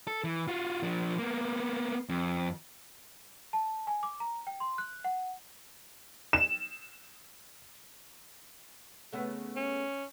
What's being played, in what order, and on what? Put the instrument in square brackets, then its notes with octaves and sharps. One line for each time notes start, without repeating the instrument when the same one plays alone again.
[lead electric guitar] A4
E3
F4 F#4
F3 D4
A#3 B3
F2
[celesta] A5
G#5
D6
A#5
G5
C6
F#6
F#5
[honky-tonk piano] E7
[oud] C#3 A3 B3
[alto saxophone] C#4